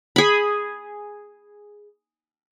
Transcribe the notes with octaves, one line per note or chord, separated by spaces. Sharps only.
G#4 B5